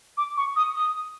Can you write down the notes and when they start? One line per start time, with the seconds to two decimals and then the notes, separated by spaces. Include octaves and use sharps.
0.18 D6
0.37 C#6
0.56 D#6
0.76 D#6